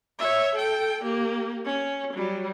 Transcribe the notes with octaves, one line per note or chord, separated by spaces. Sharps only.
C#5 E5
A4 G5
A#3 G4
C#4
F#3 G3